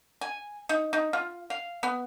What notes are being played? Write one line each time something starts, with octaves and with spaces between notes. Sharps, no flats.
G#5
D#4
D#4
F4
F5
B3